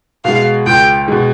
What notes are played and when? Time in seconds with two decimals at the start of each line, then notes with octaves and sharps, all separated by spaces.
0.25 B2 G#3 F5
0.66 C#2 G5
1.08 B2 G#3